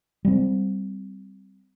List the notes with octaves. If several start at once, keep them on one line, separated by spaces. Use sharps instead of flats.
G3 A#3 C4